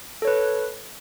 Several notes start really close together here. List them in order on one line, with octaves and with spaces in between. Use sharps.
A4 C#5 B4